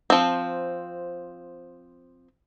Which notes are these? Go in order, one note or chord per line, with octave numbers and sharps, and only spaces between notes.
F3 C4